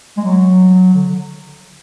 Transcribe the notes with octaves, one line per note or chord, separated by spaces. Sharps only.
G#3
F#3
D3